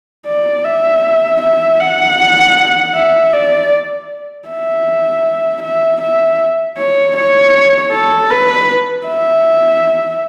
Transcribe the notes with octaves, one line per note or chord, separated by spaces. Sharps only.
D5
E5
E5
F#5
E5
D5
E5
E5
E5
C#5
C#5
A4
B4
E5